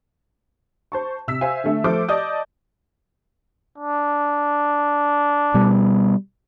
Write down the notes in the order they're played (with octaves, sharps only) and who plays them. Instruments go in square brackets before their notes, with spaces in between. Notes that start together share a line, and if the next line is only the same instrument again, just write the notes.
[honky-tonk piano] C5 A5 C#6
C3 E6 B6
C5 E5 F5 G#5
D3 A3
F3 A3 A4 C5 D6
D5 D#5 A5 D#6 G6
[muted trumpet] D4
[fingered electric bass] B2 G3